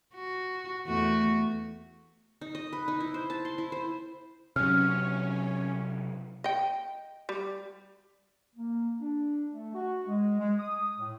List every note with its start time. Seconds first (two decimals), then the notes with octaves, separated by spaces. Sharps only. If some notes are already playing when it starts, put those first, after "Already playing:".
0.15 F#4
0.86 E2 A3 F#4
2.41 D#4
2.55 D#5
2.73 B4
2.88 D#4
3.00 E4
3.14 C5
3.30 A5
3.45 C6
3.58 E4
3.72 C5
4.56 C3 F#3 C#4 F6
6.44 D#5 G5
7.29 G3
8.56 A#3
9.00 D4
9.52 A3
9.74 F#4
10.07 G#3
10.39 G#3
10.58 D#6
10.99 A2